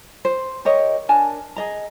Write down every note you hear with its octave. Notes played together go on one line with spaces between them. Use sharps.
C5
G4 A#4 C#5 D#5
D4 A#4 G#5 A5
G#4 D#5 A#5